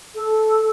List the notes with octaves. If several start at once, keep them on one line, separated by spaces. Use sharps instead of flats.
A4